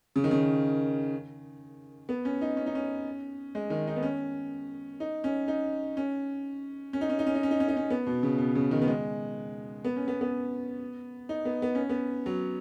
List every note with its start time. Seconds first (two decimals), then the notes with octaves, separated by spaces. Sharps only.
0.16 C#3
0.24 D#3
0.31 C#3
2.09 B3
2.25 C#4
2.41 D#4
2.57 C#4
2.66 D#4
2.75 C#4
3.55 G#3
3.70 D#3
3.87 D#4
3.96 B3
4.03 C#4
5.00 D#4
5.24 C#4
5.48 D#4
5.97 C#4
6.93 C#4
7.01 D#4
7.09 C#4
7.19 D#4
7.26 C#4
7.35 D#4
7.43 C#4
7.51 D#4
7.60 C#4
7.68 D#4
7.77 C#4
7.90 B3
8.07 B2
8.23 C#3
8.38 B2
8.55 C#3
8.71 D#3
8.82 B3
8.88 G#3
9.84 B3
9.96 C#4
10.08 B3
10.21 B3
11.29 D#4
11.45 B3
11.62 B3
11.75 C#4
11.89 B3
12.26 F#3